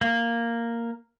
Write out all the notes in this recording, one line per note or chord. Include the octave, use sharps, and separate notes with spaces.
A#3